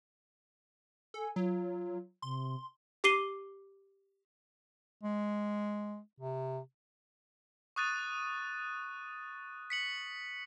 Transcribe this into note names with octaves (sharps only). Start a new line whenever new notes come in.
A4 G#5
F#3 F4
C3 C6
G4 D6 C7 D#7 G7
G#3
C3
C#6 D#6 F#6 A6 D#7
B6 C#7 F#7